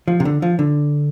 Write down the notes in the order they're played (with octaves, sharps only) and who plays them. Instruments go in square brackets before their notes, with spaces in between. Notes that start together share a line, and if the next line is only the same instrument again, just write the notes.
[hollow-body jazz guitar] F3
C3
D3
F3
D3